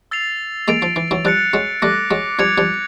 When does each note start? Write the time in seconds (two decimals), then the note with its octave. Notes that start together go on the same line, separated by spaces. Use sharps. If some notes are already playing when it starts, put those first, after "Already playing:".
0.11 E6 A6 C7 F7
0.68 G#3 A#3 A6 D7 F7
0.82 F3
0.96 E3
1.11 E3 F#3
1.25 F3 G3 F#6 A6 C#7
1.53 F#3 G#3
1.82 G3 A3 D6 F#6 A#6
2.11 F#3 G#3
2.39 F3 G3 G#6 C#7 F7
2.58 F3 G3